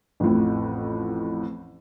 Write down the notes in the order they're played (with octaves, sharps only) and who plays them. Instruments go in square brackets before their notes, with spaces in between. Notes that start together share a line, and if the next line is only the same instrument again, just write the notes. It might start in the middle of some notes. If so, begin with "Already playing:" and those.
[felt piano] A1 F2 A2